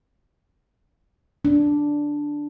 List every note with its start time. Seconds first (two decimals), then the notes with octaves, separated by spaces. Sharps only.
1.45 D4